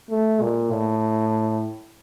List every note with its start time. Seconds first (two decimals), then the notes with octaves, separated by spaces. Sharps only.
0.10 A3
0.41 A#2
0.71 A2